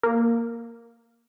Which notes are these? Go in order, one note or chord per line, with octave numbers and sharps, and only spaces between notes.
A#3